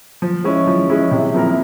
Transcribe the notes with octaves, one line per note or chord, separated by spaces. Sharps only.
F3
G#3 C#4 E4
F3
G#3 C#4 E4
C3
F3 A#3 E4 A#4